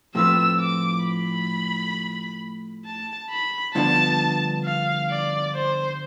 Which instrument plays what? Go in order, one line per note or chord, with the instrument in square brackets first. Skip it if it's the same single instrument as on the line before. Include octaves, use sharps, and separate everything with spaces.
[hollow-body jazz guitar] A2 F3 C4 F4 B4 [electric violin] E6
[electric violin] D6
B5
A5
B5
[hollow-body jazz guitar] G2 D3 F3 B3 D4 [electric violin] A5
[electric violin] F5
D5
C5